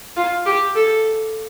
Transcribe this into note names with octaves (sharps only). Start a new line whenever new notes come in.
F4
G4
A4